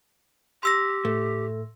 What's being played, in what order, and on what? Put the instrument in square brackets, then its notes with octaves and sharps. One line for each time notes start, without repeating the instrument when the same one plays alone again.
[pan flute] G4 [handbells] C6 E6 A#6
[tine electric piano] A2 [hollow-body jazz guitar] A3